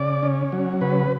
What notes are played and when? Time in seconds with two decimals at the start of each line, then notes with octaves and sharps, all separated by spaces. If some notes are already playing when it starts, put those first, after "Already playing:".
Already playing: C#3 D5
0.23 C#4
0.52 F#3
0.81 C#3 B4